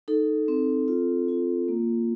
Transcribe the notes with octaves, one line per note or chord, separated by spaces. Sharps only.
D#4 A4
C4
F4
F4
A#3